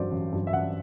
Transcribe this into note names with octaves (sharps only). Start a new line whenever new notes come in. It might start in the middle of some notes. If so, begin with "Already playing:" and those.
Already playing: A1 G2 F#3 C5 D5
A1
G2 F#3
E5
A1 F#5